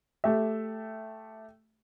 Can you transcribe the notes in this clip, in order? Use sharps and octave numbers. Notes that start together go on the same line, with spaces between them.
A3 G4 E5